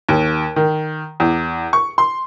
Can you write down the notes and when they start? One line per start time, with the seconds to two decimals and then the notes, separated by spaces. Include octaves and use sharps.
0.09 D#2
0.56 D#3
1.20 E2
1.73 C#6
1.98 C6